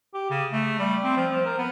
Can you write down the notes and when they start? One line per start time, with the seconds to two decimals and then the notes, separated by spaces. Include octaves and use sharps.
0.14 G4
0.30 C#3
0.52 A3
0.79 G3
1.03 C4
1.17 F3
1.31 F3
1.46 A#4
1.58 B3